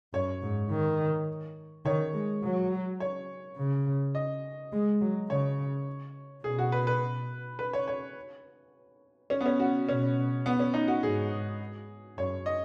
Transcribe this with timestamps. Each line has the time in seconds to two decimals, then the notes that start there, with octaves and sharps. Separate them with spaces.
0.13 F#2 C#5
0.42 G#2
0.71 D#3
1.85 D#3 C#5
2.13 G#3
2.43 F#3
3.00 C#5
3.57 C#3
4.15 D#5
4.72 G#3
5.01 F#3
5.29 C#3 C#5
6.44 B2 G#4
6.58 F#4
6.72 B4
6.87 B4
7.59 B4
7.73 C#5
7.88 C#5
9.30 C#4
9.41 B3
9.46 C#4
9.60 F#4
9.88 B2 C#4
10.46 B3
10.59 C#4
10.74 D#4
10.88 F#4
11.02 G#2 G#4
12.18 F#2 C#5
12.46 D#5